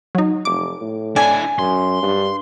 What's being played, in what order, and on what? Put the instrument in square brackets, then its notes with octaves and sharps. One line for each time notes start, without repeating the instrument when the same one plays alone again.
[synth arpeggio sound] F#3 D#4
[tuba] F1 [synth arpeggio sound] D6
[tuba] A2
[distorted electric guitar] D4 E4 [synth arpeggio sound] A4 D5 [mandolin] G#5
[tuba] F#2 [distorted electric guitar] C6
[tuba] G2